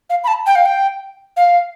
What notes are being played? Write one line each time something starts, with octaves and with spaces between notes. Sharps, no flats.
F5
B5
A5
G5
F5
G5
F5